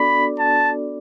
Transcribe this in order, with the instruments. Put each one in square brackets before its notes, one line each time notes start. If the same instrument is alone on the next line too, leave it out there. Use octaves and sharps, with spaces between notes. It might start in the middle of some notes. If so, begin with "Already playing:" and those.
Already playing: [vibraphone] B3 D4 F#4 A4 D5 [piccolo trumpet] B5
[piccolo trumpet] A5